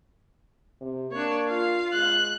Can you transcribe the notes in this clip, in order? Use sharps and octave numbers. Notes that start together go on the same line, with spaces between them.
C3
A#3 D4 C#5
F4 F5
G#3 F#6